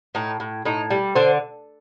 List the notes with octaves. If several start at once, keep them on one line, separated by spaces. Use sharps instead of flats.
A2 D#4
A2
A2 D#4
G3
D3 C5